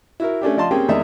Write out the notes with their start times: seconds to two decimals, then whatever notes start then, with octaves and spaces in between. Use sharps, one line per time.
0.20 E4 F#4 A#4
0.42 A3 C#4 D4 G4
0.57 F3 D5 D#5 A5 C6
0.71 A#3 C4 C#4 G4 G#4 G5
0.88 E2 D#3 G#3 D#4 D5 E5